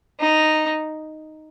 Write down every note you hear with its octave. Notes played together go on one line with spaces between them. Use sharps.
D#4